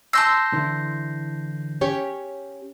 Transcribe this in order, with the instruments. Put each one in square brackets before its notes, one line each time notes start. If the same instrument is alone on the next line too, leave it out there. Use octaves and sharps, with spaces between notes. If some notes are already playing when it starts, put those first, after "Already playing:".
[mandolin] A5 C6 E6 [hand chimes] G6 A#6 C7
[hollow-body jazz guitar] D3 E3 E4
[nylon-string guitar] C#4 G4 C#5